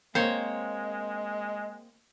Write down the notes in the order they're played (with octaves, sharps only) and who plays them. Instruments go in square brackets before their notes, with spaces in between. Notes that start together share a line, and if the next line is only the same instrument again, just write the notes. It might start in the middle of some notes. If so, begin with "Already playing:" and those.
[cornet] G#3 [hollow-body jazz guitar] A#3 C4 [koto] C5 C#5